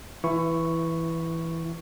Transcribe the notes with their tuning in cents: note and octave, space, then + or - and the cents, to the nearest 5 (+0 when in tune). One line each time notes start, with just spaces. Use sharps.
E3 +0 E4 +20 C#6 +0